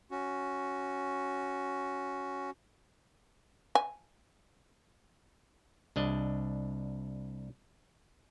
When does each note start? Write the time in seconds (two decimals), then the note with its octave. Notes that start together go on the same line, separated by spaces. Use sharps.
0.11 C#4 F#4
3.75 G#5
5.96 C2 D4 D#5